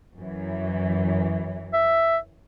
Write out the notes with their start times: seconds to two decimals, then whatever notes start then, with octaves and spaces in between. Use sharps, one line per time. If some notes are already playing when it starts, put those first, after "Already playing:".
0.20 F#2 E3
1.74 E5